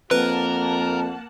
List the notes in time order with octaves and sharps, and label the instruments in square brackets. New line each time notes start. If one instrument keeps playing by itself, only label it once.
[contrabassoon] F2 [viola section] A#3 F#5 A5 [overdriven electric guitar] A#4 [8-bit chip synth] B4